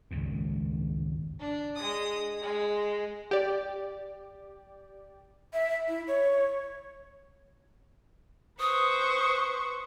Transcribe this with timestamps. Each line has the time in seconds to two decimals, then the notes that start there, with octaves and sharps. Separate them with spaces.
0.11 G#1 C#2 F#2 A#2
1.40 D4
1.76 G#3 D#6
2.42 G#3
3.31 G4 D5
5.53 E5
5.88 E4
6.07 C#5
8.60 B4 C5 C#6 D#6